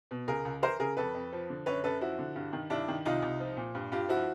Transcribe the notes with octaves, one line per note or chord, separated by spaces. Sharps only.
B2
C#2 G#4 A#4
C#2
E3 A#4 C5
C#3 G#4 A#4
F2 A4 B4
F2
F3
D3
F#2 B4 C#5
F#2 A4 B4
F3 E4 F#4
D3
G2
D#3
G2 D4 E4
D#3
C2 D#4 F4
C2
F3
A#2
G2
G2 F4 G4
F3 E4 F#4